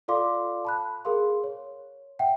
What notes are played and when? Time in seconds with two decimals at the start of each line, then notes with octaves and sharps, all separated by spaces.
0.08 F4 A4 D5 F5 C6 D6
0.65 A5 B5 F#6
1.05 G#4 A#4 F5 C6
1.44 C#5
2.19 E5 F#5 G5